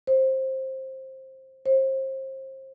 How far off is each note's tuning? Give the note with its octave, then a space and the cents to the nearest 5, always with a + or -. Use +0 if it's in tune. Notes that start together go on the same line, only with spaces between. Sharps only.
C5 +15
C5 +30